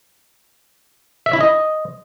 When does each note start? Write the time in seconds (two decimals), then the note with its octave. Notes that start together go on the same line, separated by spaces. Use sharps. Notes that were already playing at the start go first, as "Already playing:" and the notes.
1.26 E5
1.33 E4
1.41 D#5